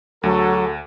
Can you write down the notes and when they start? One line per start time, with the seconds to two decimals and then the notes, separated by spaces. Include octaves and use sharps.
0.23 D2 F#3 F#4 G#4 A4